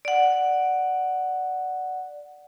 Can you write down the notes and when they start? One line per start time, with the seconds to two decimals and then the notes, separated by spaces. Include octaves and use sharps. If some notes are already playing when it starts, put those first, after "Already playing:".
0.05 D5 F#5